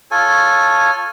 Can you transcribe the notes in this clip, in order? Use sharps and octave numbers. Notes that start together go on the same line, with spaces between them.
F4 A4 C#5 G#5